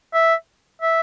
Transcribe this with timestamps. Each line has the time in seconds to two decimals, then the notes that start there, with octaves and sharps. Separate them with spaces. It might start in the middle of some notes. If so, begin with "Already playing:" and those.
0.14 E5
0.81 E5